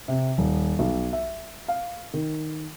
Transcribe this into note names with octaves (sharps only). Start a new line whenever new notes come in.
C3
D#1
B1
E5
F5
D#3